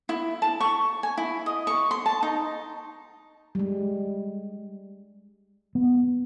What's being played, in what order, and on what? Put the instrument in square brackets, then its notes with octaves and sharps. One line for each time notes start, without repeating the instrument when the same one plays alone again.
[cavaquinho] E4
A5
C#6
G#5
E4
D#5
C#6
C6
A5
D#4
[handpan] G3 G#3
[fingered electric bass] B3